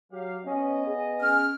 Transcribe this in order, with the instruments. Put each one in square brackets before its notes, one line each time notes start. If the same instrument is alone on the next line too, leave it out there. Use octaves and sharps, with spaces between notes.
[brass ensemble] F#3 G4 F5
[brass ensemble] B3 D#5 [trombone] C#4
[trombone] G#4
[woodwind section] C#4 F6